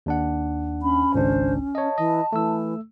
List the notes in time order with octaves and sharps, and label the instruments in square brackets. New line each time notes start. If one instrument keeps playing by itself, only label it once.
[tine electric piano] D#2 D4 F#5
[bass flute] C#4 [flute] B5
[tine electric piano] G#1 C#2 D4 [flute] C5
[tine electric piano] C#5 D#5 [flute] A5
[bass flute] E3 [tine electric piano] D#5
[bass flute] E3 [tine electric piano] A3 E6